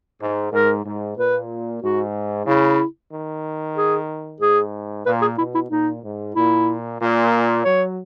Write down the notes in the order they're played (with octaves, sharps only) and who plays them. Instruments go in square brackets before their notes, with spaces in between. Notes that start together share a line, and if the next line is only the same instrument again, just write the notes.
[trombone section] G#2
[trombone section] G#2 [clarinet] A#4
[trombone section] G#2
[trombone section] A#2 [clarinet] B4
[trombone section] G#2 [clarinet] F#4
[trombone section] C#3 [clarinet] E4
[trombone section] D#3
[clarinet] G#4
[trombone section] G#2 [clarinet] G#4
[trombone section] A#2 [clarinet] B4
[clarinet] G#4
[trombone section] B2 [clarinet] E4
[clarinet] E4
[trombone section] A#2 [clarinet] D#4
[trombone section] G#2
[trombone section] A#2 [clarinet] E4
[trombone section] A#2
[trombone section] F#3 [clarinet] C#5